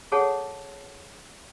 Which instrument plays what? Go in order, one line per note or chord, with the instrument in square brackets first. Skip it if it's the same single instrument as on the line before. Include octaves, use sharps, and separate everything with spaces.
[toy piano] G#4 A4 C#5 F#5 A5